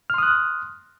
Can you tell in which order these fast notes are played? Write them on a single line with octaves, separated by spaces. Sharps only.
F6 C6 D#6 F#6